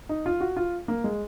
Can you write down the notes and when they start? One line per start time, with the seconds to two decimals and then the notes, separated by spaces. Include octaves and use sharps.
0.09 D#4
0.26 F4
0.41 F#4
0.57 F4
0.88 A#3
1.04 G#3